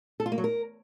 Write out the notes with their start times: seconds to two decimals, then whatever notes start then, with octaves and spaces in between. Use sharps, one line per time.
0.20 A4
0.26 F4
0.32 A#3
0.38 F#3
0.44 A#4